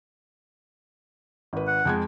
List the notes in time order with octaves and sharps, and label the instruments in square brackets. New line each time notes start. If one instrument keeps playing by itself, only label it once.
[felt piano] G#1 B4
[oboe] F#5
[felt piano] F2 G#3 G#6